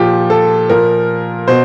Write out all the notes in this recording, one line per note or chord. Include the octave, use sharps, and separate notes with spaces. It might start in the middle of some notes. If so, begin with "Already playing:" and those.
Already playing: A#2 F3 G4
A4
A#2 F3 A#4
B2 C5